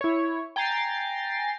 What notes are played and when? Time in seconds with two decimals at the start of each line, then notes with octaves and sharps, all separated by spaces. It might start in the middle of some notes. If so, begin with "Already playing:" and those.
0.01 E4 C#5
0.56 G5 G#5 A#5 A6 C7